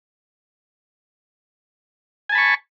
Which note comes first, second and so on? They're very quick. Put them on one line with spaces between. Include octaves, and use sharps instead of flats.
G#5 A5 B5 C#6